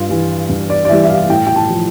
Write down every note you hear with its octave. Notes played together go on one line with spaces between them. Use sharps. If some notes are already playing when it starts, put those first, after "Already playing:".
Already playing: G2 F4
E3 G3
G2
D5
D5
E3 G3 E5
E5
F5
A2 G5
G5
A5
F3